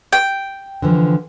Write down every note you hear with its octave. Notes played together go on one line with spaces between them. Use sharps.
G5
D3 E3 F3